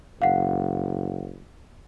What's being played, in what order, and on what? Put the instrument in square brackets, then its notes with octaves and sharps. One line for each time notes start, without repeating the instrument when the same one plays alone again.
[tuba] F#1 [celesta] F5 F#5